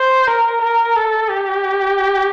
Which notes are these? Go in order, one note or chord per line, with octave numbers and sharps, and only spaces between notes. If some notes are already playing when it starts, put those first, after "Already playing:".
Already playing: C5
A#4
A#4
A4
G4